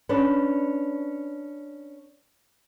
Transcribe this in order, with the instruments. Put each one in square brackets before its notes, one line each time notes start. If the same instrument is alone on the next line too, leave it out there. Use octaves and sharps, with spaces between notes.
[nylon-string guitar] C#4 D4 B4 D5